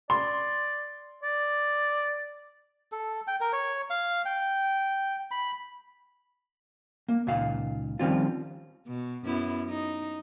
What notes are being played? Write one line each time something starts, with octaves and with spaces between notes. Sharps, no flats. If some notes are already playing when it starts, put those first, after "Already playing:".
D5 C6
D5
A4
G5
A#4
C#5
F5
G5
B5
A#3
C#2 A#2 D#3 F5
D#3 F3 G3 C4 C#4 F4
B2
F#2 B3 E4
D#4